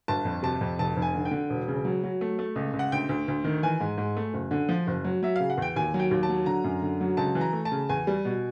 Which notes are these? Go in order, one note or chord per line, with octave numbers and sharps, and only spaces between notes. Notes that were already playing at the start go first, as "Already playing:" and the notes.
G1 A5
F2
C3 A5
F2
F1 A5
F1
G#5
D3
G5
D3
E1
C#3
F#3
F#3
A3
A3
C#2
C#2
F#5
D2 G5
D2
D2
D#3
E3 G#5
G#2
G#2
A3
F#1
D3
F3
F#1
F#3
F#3 E5
C#3 F5
F#5
E2 G5
D#2 G#5
F#3
G5
D#2
A5
F#3
D3 A#5
F#2
D3
F#3
C#2 A5
E3
A#5
A3
A5
C#3
E2 G#5
G3
B2